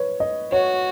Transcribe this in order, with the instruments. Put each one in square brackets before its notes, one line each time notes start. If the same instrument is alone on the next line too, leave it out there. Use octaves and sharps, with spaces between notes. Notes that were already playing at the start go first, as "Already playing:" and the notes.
Already playing: [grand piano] B4 C#5
D#5
[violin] F#4 [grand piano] C#5